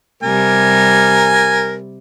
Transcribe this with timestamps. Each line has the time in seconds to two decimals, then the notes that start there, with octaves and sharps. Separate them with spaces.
0.23 C3 G3 A#4 G#5